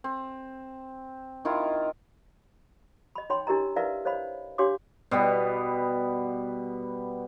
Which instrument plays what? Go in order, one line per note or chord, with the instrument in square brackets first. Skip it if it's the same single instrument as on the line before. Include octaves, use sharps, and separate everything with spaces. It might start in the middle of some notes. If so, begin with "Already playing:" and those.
[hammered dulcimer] C4
D#3 E4 F4
[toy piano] D#5 B5
D#4 C#5 G5 B5 C6
D4 E4 G4 A#4 D#5 A#5
E4 A#4 B4 D5 E5 F5
C5 C#5 D#5 F5 B5
D4 G4 C#5 F5 C6 D6
[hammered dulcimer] B2 G3 B3